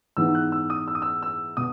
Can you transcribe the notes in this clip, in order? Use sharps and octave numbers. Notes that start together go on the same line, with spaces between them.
G#2 E3 B3 D#4 E6
F#6
E6
D#6
E6
D#6
E6
E6
B2 D#6